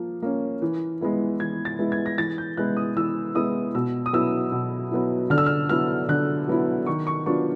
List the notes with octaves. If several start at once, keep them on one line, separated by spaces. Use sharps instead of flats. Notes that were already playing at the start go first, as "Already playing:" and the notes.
Already playing: F3 A#3
A#3 C#4
E3
G#3 B3 E4
E3 G#6
A6
G#3 B3 E4
G#6
A#6
E3 A6
G6
G#3 B3 E4 F#6
D#6
E3 E6
G#3 B3 E4 D#6
B2 E6
D#6
F#3 B3 E4 E6
B2
F#3 B3 E4
D3 F6
E6
F6
F#3 B3 E4 F6
D3 F#6
F#3 B3 E4
D#3 C#6
C#6
F#3 B3 D4 F4 C#6